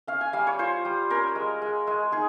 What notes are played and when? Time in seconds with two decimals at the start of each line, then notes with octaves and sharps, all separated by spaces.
0.07 C#4 F5
0.21 G#5
0.33 G3 F5
0.47 C#5
0.59 F4 C5
0.85 G3
1.10 C#4 A#4
1.35 G#3
1.62 G#3
1.87 G#3
2.12 D#4 G#4